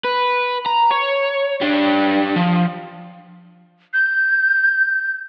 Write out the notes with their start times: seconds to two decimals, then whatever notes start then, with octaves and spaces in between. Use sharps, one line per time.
0.05 B4
0.66 A#5
0.91 C#5
1.61 G3 D4
2.36 F3
3.94 G6